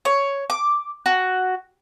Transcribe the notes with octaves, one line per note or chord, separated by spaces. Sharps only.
C#5
D6
F#4